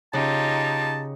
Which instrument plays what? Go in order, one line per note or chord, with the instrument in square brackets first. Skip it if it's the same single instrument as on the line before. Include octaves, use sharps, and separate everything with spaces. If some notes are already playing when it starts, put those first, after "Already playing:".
[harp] C#3 [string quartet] D#4 F4 G4 [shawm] A5